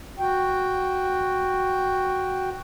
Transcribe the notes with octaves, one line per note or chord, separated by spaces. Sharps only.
F#4 G5